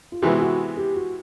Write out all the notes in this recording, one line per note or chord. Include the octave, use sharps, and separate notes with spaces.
F4
C3 E3 G#3 B3 F#4
F#4
G4
F#4